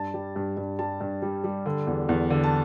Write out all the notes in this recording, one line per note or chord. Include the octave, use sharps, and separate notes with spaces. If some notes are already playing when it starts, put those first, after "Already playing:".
Already playing: G2 A5
G3
G2
G2
G3 A5
G2
G3
G3
D3
E2
E2
D3
A5